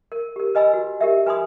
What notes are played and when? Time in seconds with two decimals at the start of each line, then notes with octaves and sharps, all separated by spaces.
0.12 A#4
0.36 G4 A#4
0.55 B4 D#5 G#5 B5 E6
0.74 F#4
1.01 G4 A#4 E5
1.26 B4 G#5 B5 C6 D#6